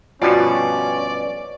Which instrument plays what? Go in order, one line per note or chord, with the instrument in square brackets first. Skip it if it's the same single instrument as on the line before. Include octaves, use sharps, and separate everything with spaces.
[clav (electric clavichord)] G2 B2 F3 [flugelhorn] C#4 [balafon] F4 F#4 [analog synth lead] D5